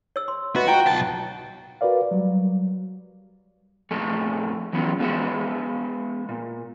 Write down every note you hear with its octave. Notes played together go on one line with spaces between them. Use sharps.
C#5 E6
C6
F#4 B4 D#5 E5
F4 G5 A#5
B1 A5
F#4 A#4 B4 D5 F5
F#3 G3
F2 A#2 A3 A4 G#5
E3 F#3 B3 C#4 F4
G#3 B3 F#4 A4 C5 E5
A#2